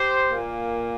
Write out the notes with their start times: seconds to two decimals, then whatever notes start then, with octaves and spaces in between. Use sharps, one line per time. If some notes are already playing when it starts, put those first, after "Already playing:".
Already playing: G4 C5
0.31 A#2 A#3